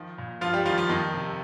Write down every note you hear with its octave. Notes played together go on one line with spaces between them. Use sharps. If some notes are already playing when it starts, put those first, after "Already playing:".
Already playing: D#3 F3
A#2
G2 F3 F4
G3 G4
D#3 F3 F4
F3 F4
F2 D#3 D#4
C3